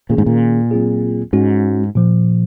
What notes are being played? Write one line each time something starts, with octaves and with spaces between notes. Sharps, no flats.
A#2 D#3 A#3 C#4 G#4
G#2
A#2
F#3 C4 F4 G#4
G#2 G#3 C#4 F#4
A#2 F3